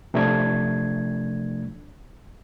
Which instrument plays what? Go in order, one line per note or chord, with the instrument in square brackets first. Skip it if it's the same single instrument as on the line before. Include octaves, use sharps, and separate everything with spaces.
[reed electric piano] C3 F3 A3 D4 G#6